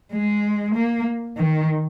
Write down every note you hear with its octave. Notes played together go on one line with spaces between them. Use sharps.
G#3
A#3
D#3